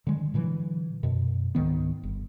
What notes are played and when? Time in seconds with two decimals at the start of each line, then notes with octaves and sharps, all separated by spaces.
0.07 D3 D#3 G#3
0.34 A#2 D3 E3 F#3
1.03 F#2 B2
1.55 C#2 G#2 D#3 B3
2.03 G1